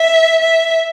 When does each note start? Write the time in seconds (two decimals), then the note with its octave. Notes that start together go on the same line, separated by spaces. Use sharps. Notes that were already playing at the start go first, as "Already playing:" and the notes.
Already playing: E5
0.42 E5